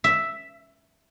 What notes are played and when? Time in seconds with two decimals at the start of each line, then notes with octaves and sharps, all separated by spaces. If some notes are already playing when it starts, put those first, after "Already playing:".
0.04 E5